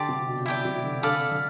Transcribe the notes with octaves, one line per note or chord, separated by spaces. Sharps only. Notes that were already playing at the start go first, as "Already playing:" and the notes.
Already playing: D3 G4 D5 A5 C6
C3
B2
B2 E4 G4 D5
C3
D3
D3 A4 D5 F5 B5
D3